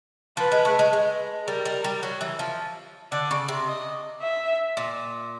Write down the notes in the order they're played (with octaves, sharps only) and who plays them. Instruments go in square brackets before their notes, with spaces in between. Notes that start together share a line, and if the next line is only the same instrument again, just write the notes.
[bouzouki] F3 [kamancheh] B4
[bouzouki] G#3
A3
G#3
G#3
[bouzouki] G3 [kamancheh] A#4
[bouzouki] G3
G3
F#3
E3
F3
[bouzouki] D3 [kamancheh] D5
[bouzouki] C#3
C3
[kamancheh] D#5
E5
[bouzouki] A#2